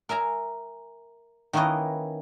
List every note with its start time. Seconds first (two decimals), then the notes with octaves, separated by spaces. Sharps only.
0.09 A#4 E5 G#5 A#5
1.53 D#3 A#3 C#4 E4 B4 D#5